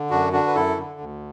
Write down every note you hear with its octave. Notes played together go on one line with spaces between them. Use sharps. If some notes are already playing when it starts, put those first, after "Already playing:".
Already playing: D3
F#2 D4 F#4
D3 D4 F#4
B4
F#2 E4 A4
D3
D2